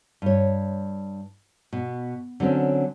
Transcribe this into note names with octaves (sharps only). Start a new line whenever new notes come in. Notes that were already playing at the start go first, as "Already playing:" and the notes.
G2 C#5
B2
D3 F#3 C4 C#4